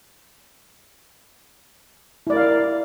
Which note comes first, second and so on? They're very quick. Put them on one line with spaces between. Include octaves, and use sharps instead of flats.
E4 D5 A#4 F5